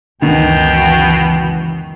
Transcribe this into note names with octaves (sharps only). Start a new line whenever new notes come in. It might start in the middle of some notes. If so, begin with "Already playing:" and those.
C#2 F#2 B2 D#3 E3 G5